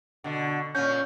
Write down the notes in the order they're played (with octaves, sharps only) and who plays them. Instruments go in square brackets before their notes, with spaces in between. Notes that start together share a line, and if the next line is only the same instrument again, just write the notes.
[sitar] B2 D3
[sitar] A#2 C#4 [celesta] G6